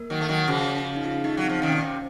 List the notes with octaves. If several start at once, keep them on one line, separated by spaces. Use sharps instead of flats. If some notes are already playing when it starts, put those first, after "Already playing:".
Already playing: A#3 A#4
D#3 F#3
A3
D#3 F#3
C#3 F3 F#4
D#4
F4
A3 D#4
F#3
C4
F3
C3 D#3 C#4
A#2
C3